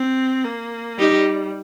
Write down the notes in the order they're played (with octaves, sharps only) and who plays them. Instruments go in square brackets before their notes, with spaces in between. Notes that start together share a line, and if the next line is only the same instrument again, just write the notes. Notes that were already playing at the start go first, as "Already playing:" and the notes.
Already playing: [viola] C4
A#3
[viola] G3 [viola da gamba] D#4 G4